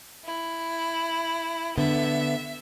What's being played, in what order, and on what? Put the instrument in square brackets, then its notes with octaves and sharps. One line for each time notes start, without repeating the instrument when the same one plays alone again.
[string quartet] E4
[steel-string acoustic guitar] D3 B3 [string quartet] E5